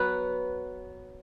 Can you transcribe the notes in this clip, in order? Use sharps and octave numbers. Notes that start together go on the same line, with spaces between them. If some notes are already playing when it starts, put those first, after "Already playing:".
Already playing: F#3 B3 B4